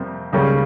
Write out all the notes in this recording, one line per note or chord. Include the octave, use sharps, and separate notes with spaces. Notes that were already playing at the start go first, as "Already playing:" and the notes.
Already playing: F2 C3 G3 A#3
C#2 C#3 G3 A#3 C#4